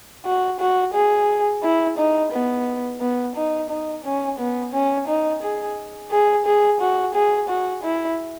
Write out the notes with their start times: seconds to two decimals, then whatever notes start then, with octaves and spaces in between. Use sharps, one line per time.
0.26 F#4
0.60 F#4
0.95 G#4
1.63 E4
1.98 D#4
2.32 B3
3.01 B3
3.36 D#4
3.70 D#4
4.05 C#4
4.39 B3
4.74 C#4
5.08 D#4
5.43 G#4
6.11 G#4
6.46 G#4
6.80 F#4
7.15 G#4
7.49 F#4
7.84 E4